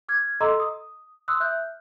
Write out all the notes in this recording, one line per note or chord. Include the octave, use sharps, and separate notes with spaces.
D6 F6 G#6
A4 D#5 A#5 C6 D6 E6
D#6
C6 D#6 E6 F#6
E5 F#6 G6
F6